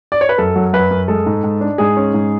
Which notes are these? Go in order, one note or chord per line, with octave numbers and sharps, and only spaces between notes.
D5
C#5
B4
F#2 A4
F#3
F#2 B4
F#2
G#3 A4
G#2
G#2
D4
G#2 G#4
C#4
G#2